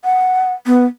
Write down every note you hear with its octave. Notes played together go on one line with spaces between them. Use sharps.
F#5
B3